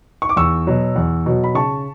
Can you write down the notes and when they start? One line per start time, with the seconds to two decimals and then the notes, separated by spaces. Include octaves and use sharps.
0.22 C#6
0.29 D6
0.36 E2 C#6 E6
0.67 B2 F#3
0.96 E2
1.26 B2 F#3
1.44 B5
1.55 C#3 A5 C#6